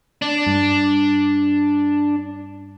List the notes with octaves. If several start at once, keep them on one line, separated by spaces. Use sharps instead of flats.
D4
G2